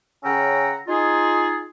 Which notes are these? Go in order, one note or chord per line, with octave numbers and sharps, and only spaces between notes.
C#3 C#4 F#5 G5 A#5 E6
D#4 F4 G#4